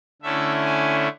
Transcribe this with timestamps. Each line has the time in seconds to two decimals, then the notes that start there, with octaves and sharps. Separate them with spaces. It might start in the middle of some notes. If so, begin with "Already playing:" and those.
0.22 D3 A3 C#4 E4 E5
0.66 G#5